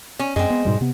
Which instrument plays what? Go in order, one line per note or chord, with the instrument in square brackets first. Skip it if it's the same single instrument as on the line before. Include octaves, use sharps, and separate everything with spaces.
[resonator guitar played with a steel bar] C#4
[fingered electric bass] F#2 [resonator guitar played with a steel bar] G#3 C4
[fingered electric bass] B3
G#2 B2 G3
C3 B3